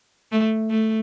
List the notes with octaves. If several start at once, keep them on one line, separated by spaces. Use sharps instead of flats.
A3
A3